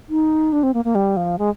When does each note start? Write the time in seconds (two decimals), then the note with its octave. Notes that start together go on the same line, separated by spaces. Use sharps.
0.09 D#4
0.52 D4
0.63 C4
0.74 A#3
0.85 A#3
0.95 G3
1.17 F3
1.38 G#3